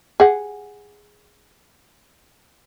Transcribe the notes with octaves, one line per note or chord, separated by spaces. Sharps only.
G#4 F#5